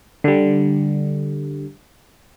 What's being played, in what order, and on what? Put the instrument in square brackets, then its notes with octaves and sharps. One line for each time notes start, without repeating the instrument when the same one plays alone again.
[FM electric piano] D3 G3